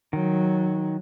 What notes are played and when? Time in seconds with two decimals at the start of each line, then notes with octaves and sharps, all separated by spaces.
0.13 D#3 F#3